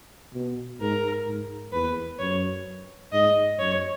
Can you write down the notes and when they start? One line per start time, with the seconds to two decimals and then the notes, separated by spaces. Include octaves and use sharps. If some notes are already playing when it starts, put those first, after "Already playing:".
0.34 B2
0.80 G#2 A#4
1.26 G#2
1.72 E2 B4
2.19 F#2 C#5
3.12 G#2 D#5
3.59 F#2 C#5